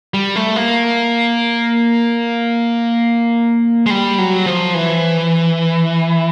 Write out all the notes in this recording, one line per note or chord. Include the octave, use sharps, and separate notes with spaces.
G3
A3
A#3
G#3
G3
F#3
F3
E3